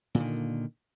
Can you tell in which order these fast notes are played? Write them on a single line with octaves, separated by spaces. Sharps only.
A#2 D3 D#3